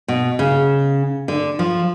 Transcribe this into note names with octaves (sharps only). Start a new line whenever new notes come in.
B2
C#3
D3
F3